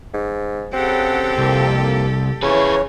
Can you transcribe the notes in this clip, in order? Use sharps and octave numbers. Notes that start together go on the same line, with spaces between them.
G#2
C#3 C4 G4 A4 F#5
C2 F2 A#3
C#3 E3 G#4 B4 C#5